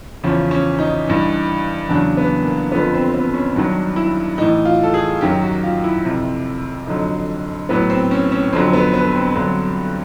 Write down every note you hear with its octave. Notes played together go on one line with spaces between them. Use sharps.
E2 C#3 F3 C#4
C#4
D#4
G2 E3
E2 C#3 F#3 D4
B3
A#3
F2 D3 F3 B3
C4
C4
B3
C#4
G2 D#3 F#3 D4
E4
A2 E3 D#4
F4
A4
G#4
F#2 D#3 F#3 G4
F#4
F4
E4
F2 C3 F3
F2 D3 F#3 D#4
A2 F#3 B3
C4
C#4
C#4
F2 D3 F#3 C4
B3
B3
C4
G2 D3 F#3